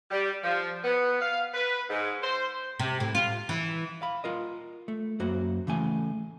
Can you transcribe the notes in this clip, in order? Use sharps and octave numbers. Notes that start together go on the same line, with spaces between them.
G3
F3
B3
F5
B4
G#2
C5
C3
A2
F4
E3
F5 B5
F4 A#4 D#5
A3
F#2 A#3 F#4 C5
C#3 E3 A3 G#5